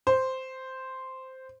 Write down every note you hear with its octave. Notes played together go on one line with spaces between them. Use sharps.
C5